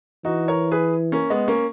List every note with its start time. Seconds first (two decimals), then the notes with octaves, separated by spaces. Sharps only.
0.25 E3 D#4 F#4
0.48 A#4 C#5
0.71 G#4 B4
1.12 A#3 C#4
1.30 G#3 B3
1.48 A#3 C#4